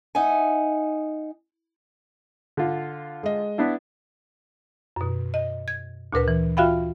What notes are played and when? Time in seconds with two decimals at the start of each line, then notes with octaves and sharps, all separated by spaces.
0.15 D#4 E5 F#5 G#5
2.57 D3 F4
3.23 G#3 D#5
3.58 B3 D4 E4
4.96 F#2 B2
5.34 D#5
5.68 G#6
6.13 D2 A#2 A#4 B4
6.28 E3
6.57 F4 F#4 E5 F5 G5 B5